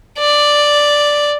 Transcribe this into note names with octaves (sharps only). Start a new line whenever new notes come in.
D5